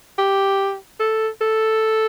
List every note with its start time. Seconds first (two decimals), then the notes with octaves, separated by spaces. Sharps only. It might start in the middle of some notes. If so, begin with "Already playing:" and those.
0.18 G4
1.00 A4
1.41 A4